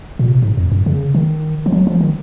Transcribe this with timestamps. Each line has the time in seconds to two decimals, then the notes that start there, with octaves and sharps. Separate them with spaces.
0.19 A#2
0.28 C3
0.42 G#2
0.57 F2
0.72 F#2
0.86 C#3
1.15 D#3
1.66 F3
1.72 F#3
1.87 F3
2.01 D#3